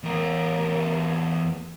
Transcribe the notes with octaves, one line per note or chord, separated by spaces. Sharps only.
E2 A#4